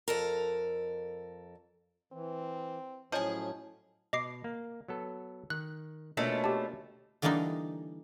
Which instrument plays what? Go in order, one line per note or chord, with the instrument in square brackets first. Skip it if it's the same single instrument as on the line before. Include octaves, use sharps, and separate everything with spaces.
[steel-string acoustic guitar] F2 A4 A#4
[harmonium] E3 [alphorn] C4
[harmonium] A2 F#3 C#4 [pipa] F3 G#4 [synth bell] C#5 D#5 A5
[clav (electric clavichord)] B2 [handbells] D#5 D6 C7
[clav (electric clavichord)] A#3
F#3 B3 A4
[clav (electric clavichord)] D#3 [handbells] F#6
[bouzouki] B2 A3 C#4 [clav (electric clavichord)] A#3 D4 F4
[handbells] G4 A5
[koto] D3 E3 G3 A#3 D4 D#4